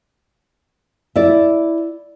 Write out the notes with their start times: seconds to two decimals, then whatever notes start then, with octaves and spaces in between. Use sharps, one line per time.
1.16 E4 D5